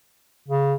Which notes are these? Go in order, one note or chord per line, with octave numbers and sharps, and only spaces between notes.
C#3